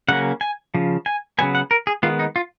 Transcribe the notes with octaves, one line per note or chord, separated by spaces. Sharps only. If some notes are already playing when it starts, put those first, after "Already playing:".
C#3 F#3 A#3 C#4 F#5
G#5
C#3 F3
G#5
C#3 F#3 B3 G#5
F#5
A#4
G#4
D#3 G#3 B3 F4
D#4
F4